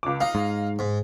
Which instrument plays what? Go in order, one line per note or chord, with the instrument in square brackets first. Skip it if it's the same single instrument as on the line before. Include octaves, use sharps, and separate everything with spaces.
[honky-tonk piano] C#2 D6
[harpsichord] D#4 [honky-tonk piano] F5
[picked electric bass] G#2
[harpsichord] G#2